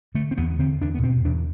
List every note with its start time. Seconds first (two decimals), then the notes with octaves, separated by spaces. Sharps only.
0.15 D3 A3
0.31 C4
0.37 E2 B3
0.59 D3 C4
0.81 E2 D4
0.94 B3
1.03 B2 C4
1.25 E2 D4